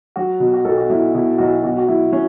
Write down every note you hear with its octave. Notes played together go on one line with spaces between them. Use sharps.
F#3 F#4
B2
F#4
B1 A4
F#4
B1 E4
B2 E4
B1 F#4
B2 F#4
F#4
F#3 E4
F#3 C#4